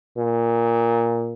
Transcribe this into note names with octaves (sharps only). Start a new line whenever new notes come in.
A#2